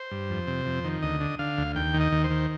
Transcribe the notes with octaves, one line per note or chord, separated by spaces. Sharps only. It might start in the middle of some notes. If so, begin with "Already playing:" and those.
Already playing: C5
G2
F2
C3
F2
D#3
D2 D#5
D3
D3 F5
D2
D#2 G5
D#3
D#5
D#2
C5
D#3